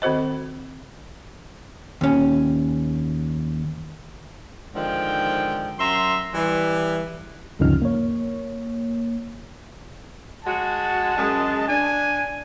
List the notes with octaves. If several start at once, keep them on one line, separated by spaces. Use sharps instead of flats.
D#3 C4 F#4 C5 D#5
D#2 C#4
G#2 D3 D#3 F3 G5
F#2 E5 A#5 C6
E3 G3
D2 G2 C#3 F3 D#4 F6
A#3 C#5
G#3 F#4 A5
F#2 G#3
D4 G#5